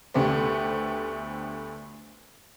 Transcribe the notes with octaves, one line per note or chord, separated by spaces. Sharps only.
D2 D3 A3 B3 G4 C5